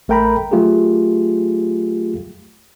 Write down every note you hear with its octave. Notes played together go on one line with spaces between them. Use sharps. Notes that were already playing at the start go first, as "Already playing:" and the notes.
A1 A3 A#4 G5 A#5 B5
F#3 A3 F4 G4 G#4